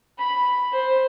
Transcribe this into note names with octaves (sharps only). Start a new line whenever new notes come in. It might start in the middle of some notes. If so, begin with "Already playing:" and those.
B5
C5